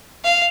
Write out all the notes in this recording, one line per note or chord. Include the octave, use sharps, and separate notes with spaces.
F5